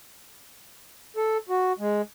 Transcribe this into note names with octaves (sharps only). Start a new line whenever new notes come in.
A4
F#4
G#3